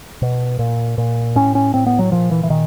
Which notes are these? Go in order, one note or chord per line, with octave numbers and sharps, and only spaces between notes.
B2
A#2
A#2
A2 C#4
C#4
A2 C4
B3
F#3
A#2 F3
E3
E3
A#2 D#3